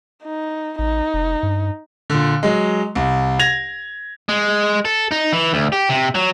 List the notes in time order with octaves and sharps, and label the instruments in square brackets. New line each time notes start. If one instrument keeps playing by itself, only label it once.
[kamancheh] D#4
[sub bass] A1 [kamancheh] D#4
[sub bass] F1
G2
[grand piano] A#2 D3
F#3 G#3
C2
G#6 A#6 F7
[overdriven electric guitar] G#3
A4
D#4
E3
D2
G4
C3
F#3